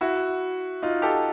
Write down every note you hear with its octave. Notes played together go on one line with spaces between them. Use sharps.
E4 F#4
D#4 F4
G4 A4